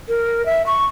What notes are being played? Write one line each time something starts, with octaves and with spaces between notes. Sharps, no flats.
A#4
E5
C#6